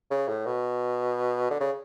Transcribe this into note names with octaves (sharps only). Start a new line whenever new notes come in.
C#3
A2
B2
D3
C#3